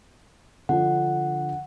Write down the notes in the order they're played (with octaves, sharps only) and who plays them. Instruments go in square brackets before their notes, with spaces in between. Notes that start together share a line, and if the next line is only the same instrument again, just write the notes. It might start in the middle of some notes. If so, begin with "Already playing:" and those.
[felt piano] D3 F3 D4 [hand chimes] F#5